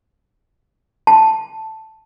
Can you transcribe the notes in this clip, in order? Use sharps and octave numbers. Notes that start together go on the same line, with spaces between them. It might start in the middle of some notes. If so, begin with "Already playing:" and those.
A5